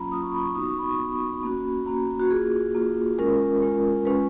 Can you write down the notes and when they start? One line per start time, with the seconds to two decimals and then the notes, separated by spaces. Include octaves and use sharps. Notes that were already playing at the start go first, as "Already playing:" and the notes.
Already playing: F#3 A#3 C#4 F4 A#5 B5
0.12 F#3 A#3 C#4 F4 D#6
0.23 C#6
0.33 B5
0.44 C#6
0.55 B3 D#4 F#4 D#6
0.70 C#6
0.79 B5
0.84 C#6
0.99 B3 D#4 F#4 B5
1.43 A#3 C#4 F#4
1.86 A#3 C#4 F#4 A#5
2.19 F#4
2.31 A#3 F4 G#4
2.75 A#3 F4
3.18 G#3 C#4 F4 A#4
3.62 G#3 C#4 F4
4.05 G#3 C#4 F4 B4